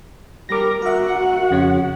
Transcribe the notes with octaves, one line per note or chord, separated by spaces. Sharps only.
G3 A#4 D6 A#6
F#4 A#4 E5 F#5
F2 C#3 C#4